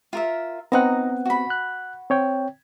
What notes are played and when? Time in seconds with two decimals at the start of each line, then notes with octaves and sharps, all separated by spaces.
0.13 F4 A#4 E5
0.72 B3 C4 D#4 F#5 A#5
1.25 F#4 B5
1.50 F#6
2.10 C4 C#5 G5